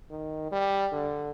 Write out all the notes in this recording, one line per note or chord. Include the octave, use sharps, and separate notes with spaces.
D#3
G3
D3